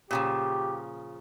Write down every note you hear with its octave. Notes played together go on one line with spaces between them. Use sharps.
A#2 C#3 F3 G4